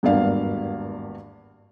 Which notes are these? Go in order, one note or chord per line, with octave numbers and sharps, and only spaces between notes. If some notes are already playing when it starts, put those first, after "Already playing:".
G#1 E2 G2 A#3 D4 F5